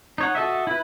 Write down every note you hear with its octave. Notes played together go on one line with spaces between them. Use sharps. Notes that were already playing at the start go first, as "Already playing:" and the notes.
D#4 C#5 F#5
F#4 A4 D#5 E5
E4 B4